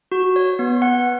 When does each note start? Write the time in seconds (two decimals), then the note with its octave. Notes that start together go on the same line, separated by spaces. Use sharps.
0.12 F#4
0.36 C#5
0.59 B3
0.82 F#5